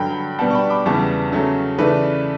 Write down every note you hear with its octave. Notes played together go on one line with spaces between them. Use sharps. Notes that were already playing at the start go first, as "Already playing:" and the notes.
Already playing: G2 D3 F#3 G5 B5
B2 G3 B3 D4 F#5 A5
C#6
G5 B5
B5 D6
E2 C#3 E3 G3 B3 A5 C#6
C#3 F#3 A3 C#4
C#3 E3 A3 B4 D5